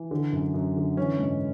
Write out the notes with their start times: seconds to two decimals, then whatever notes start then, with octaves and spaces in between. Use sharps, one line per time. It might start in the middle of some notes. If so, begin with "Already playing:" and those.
Already playing: E3
0.11 D3
0.32 F#2
0.54 F#2
0.76 D3
0.97 E3 C#4
1.19 G#2